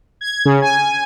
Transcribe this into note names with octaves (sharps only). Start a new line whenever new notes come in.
G#6
C#3
G#5